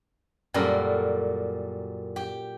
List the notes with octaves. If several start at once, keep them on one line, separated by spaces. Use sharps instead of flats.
F#2 A#2 G3 A4 A#4 B5
G4